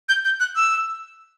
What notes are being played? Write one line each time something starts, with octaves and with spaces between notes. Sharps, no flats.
G6
G6
F#6
E6